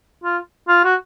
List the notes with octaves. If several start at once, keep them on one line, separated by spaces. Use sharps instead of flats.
F4
F4
F#4